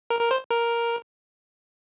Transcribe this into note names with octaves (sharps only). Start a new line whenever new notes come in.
A#4
A#4
C5
A#4